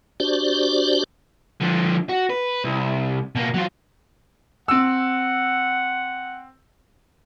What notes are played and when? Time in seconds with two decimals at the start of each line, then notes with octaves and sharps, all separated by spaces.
0.20 D4 F#4 G4 C5 D5
1.61 D3 F3
2.09 F#4
2.30 B4
2.64 C2
3.35 B2 A#3
3.54 F#3 F4
4.68 C4 F#5 E6